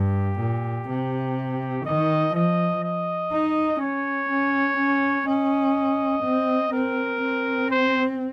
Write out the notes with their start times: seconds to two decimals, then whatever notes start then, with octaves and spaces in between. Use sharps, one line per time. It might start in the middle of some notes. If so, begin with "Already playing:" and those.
Already playing: G2 G4
0.40 A#2
0.89 C3
1.86 D#3 D#5
2.35 F3 D#5
2.84 D#5
3.32 D#4
3.81 C#4 C#5
4.30 C#4
4.78 C#4
5.27 C#4 D#5
6.24 C4
6.73 C4 A#4
7.22 C4
7.70 C5